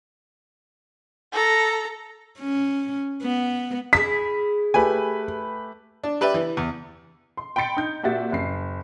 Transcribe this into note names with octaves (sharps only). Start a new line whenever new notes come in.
A4 A#5
C#4
B3
E4 G#4 B6
A3 G4 B4 G#5
D4
G4 B4 D5 E5
E3
E2
C6
G5 B5 C6 A6 C#7
D#4 G6
A#2 F#4 G4 E5 A6
F#1 C7